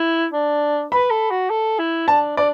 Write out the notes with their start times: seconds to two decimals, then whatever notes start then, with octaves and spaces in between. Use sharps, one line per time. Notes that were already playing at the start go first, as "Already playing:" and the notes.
Already playing: E4
0.33 D4
0.92 B4 B5
1.10 A4
1.30 F#4
1.50 A4
1.79 E4
2.08 D4 A5
2.37 D4 D5